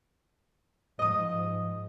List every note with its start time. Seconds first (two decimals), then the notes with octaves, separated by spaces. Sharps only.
0.99 G#2 F3 D#5 D#6